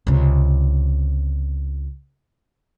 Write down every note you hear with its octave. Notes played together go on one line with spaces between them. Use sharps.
C#2 C3